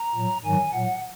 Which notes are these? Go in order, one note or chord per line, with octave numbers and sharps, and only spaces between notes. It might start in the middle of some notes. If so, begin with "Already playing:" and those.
Already playing: A#5
A#2 F#3
G#2 D#3 F#3 G#5
A#2 F#3 F#5